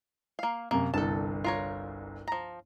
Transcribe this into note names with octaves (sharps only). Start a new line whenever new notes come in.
A#3 F5
F#2 C3 A#3
G1 C2 A4 A5
F4 A#4 C#5
F3 A#5